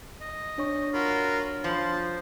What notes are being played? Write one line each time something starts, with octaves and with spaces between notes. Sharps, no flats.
D#5
D4 C#5 C#6
F4 F#4 A#4 B5
F3 C5 A5